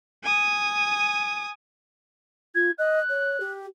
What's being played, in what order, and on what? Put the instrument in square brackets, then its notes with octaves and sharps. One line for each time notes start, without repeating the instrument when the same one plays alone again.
[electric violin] G#5 D#6
[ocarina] F4 [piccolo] G#6
[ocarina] D#5 [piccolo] F#6
[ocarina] C#5
G4